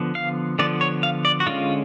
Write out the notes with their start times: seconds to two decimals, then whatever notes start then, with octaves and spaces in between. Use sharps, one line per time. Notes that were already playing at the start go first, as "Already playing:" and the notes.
Already playing: D3 F3 B3
0.15 F5
0.59 D3 F3 B3 D5
0.81 C#5
1.03 F5
1.25 D5
1.40 F#4
1.46 D3 G#3 C#4 F4